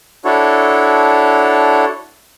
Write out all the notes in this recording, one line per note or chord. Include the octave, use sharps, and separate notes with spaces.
D4 E4 F#4 A4 C#5